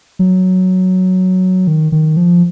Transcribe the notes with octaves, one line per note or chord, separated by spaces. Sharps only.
F#3
D#3
D#3
F3